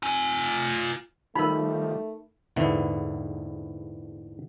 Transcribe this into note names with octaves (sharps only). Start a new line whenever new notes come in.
F4 G#5
D#3 F3 G3 A3 D#4 A#4 B5
A#1 E2 G#2 D3 B3 E4